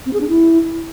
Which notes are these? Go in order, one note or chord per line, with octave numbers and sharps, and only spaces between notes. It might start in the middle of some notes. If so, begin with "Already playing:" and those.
C4
G#4
D4
E4